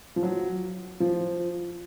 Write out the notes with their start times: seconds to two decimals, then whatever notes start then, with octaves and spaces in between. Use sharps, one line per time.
0.16 F3
0.23 F#3
1.00 F3